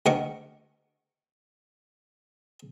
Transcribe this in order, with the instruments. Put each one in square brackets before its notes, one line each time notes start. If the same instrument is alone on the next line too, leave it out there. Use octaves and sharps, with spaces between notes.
[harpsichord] D2 D#3 A#4 F#5